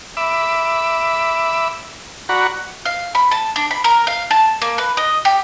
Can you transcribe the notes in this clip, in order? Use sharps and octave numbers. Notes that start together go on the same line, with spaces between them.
E5 B5 D6 E6
F#4 D5 F#5 A#5 B5 C#6
F5
B5
A5
D4
B5
A#4
F5
A5
A#3
B4
D#5
G4